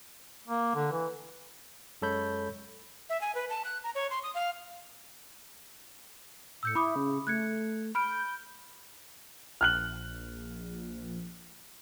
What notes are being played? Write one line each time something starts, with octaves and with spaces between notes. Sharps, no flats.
A#3
D3
E3
F#2 G#3 A4 C#5 B5 G6
E5
G#5
B4
A5
F#6
A#5
C#5
C6
D#6
F5
A2 E6 G6 C#7
E4 B5 D6 D#6
C#3
A3 F#6 G#6 C#7
B5 F6 G6 D7
A#1 F6 F#6 F#7